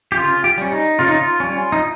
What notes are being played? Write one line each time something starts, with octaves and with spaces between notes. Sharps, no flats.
G4
C#3 F4
G4
G3 C#4
D#4
C#3 F4
D#4
F4
G3 C#4
D#4